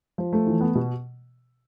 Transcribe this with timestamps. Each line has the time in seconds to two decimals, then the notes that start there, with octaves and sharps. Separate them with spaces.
0.18 F3
0.33 A3
0.47 E3
0.61 B3
0.75 B2